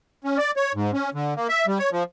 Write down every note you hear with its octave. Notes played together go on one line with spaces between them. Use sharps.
C#4
D5
C#5
G#2
C#4
D3
A#3
E5
G3
C#5
F3